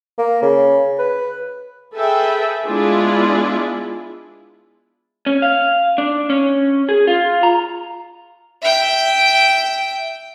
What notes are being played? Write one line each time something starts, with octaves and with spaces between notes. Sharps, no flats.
A#3
C#3
B4
G#4 A4 B4 E5 G5
G#3 B3 D4 E4 F4 G#4
C#4
F5
D4
C#4
G#4
F4
A#5
E5 G5